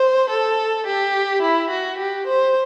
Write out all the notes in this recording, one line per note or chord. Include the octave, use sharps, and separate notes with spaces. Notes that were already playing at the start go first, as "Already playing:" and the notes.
Already playing: C5
A4
G4
E4
F#4
G4
C5